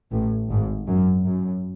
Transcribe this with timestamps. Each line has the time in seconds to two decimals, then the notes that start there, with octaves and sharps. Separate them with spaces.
0.12 A1 A2
0.49 G#1 G#2
0.87 F#2
1.25 F#2